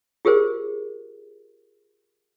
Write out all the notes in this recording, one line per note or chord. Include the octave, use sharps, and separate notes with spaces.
F4 G4 G#4 A#4 C5